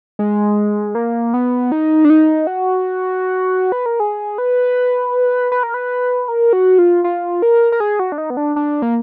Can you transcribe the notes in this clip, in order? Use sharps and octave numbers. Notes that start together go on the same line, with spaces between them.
G#3
A#3
B3
D#4
D4
D#4
F#4
B4
A#4
G#4
B4
B4
A#4
B4
A#4
F#4
F4
F4
A#4
A#4
G#4
F#4
D4
D#4
B3
D4
D4
A#3